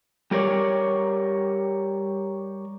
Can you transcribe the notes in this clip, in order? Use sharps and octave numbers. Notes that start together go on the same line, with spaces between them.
G3 G4 A#4 C#5 D5